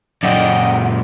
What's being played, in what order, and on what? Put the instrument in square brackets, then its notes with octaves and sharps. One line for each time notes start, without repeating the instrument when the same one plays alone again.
[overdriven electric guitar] F#2 A#2 [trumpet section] D5 D#5 G5 [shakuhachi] F#5